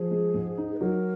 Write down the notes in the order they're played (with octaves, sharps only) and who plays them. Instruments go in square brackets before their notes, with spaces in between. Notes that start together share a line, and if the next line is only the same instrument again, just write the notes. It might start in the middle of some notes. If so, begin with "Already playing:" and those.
Already playing: [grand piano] F3 [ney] G#4
[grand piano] G#3
G#2
D#4
[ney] B4
[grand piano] F#3 [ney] A#4